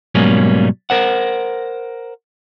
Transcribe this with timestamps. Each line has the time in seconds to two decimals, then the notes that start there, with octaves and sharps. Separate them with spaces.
0.15 G#2 B2 F#3 G3 A#3 C#4
0.90 A#4 C5 F#5